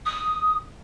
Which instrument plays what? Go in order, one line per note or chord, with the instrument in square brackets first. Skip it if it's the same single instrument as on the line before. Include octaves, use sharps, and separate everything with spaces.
[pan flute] D#6